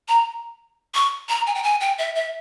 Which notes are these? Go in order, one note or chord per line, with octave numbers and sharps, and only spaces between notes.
A#5
C#6
A#5
G#5
G5
G#5
G5
E5
E5